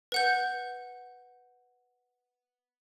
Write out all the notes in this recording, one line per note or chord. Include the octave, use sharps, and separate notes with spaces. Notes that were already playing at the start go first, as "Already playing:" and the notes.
B4 F#5 G6